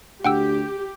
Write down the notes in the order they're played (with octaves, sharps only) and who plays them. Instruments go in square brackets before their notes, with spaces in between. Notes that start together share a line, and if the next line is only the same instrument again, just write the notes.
[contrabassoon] D2 [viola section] G4 [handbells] F#5 G5 E6